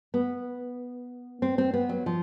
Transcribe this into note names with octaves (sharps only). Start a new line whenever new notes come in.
B3
C4
C4
B3
F#3
F3